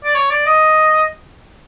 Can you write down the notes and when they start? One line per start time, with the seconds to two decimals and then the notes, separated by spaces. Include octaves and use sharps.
0.04 D5
0.15 C#5
0.30 D5
0.46 D#5